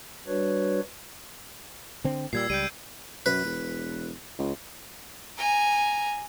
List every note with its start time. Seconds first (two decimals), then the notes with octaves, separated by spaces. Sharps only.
0.27 G3 D4 F#4 B4 C#5
2.04 D3 C4
2.33 A#2 G3 E6 G#6 C7
2.50 C#2 G3 G6 D7 D#7
3.26 F#2 B4
3.45 E1
4.39 C#2
5.38 G#5 A#5